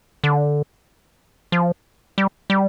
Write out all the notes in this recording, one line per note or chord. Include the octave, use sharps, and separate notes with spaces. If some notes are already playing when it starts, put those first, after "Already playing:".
D3
F3
G3
G3